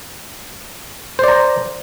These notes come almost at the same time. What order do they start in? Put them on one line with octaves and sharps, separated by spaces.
C5 D5 A#5